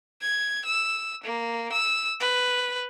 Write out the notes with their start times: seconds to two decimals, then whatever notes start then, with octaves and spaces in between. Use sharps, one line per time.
0.22 G#6
0.65 E6
1.24 A#3
1.72 E6
2.20 B4